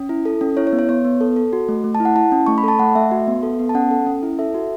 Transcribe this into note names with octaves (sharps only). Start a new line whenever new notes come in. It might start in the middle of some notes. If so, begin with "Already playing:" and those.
Already playing: C#4
E4
A4
C#4
E4 C#5
C#5
B3
C#5
B3 C#5
B3
A4
A4
F#4
A3
A3
A5
E4
F#5
E4 A5
C#4
A3 C#6
B5
A4 A5
A3 F#5
A3 E5
F#4
B3
A4
B3
A5
C#4 F#5
A4
C#4
E4
A4 E5
F#4